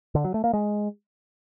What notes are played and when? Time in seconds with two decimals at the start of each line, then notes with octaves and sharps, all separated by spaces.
0.15 D3
0.24 F#3
0.34 A3
0.44 A#3
0.53 G#3